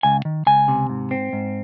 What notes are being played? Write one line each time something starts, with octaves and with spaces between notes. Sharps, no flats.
C#2 G#5
D#3
C#2 G#5
C3
G#2
C4
G#2